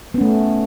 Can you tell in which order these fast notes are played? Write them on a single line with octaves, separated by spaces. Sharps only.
B3 C#4 A3